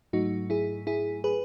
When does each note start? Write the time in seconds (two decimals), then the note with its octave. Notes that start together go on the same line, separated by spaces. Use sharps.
0.13 G#2 F#3 A3 D#4 F#4
0.50 E4 G#4
0.87 E4 G#4
1.24 G#4 B4